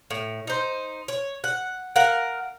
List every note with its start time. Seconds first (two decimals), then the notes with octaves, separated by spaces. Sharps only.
0.11 A2
0.47 D#4 C5
1.08 C#5
1.44 F#5
1.96 A#4 F5 F#5